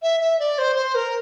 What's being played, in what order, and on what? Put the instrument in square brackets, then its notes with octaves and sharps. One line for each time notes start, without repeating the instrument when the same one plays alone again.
[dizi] E5
E5
D5
C5
C5
A#4